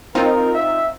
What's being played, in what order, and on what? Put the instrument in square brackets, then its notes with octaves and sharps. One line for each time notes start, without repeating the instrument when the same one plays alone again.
[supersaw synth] C4 D#4 F4 [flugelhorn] A#4
[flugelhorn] E5